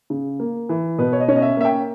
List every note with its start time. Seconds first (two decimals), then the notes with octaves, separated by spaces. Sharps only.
0.10 C#3
0.40 A#3
0.69 E3
0.98 B2 B4
1.13 C#5
1.20 D#5
1.28 C#4 C#5
1.36 D#5
1.42 E5
1.57 A#3 E5
1.65 G5